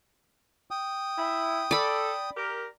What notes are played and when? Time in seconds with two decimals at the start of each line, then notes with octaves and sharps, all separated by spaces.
0.71 G5 D#6
1.17 E4
1.71 A4 D5 B5
2.34 G4 A#4